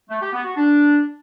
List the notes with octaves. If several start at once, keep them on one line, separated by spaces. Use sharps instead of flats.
A3
G4
B3
F#4
D4